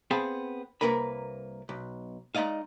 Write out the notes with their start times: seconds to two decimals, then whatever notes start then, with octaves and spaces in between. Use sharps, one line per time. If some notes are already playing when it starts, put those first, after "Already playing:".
0.11 B3 C4 G#4 F5 A5 B5
0.81 C2 G#2 A#3 A#4 B4 B5
1.69 B1
2.35 G#3 D#4 D5 D#5 F5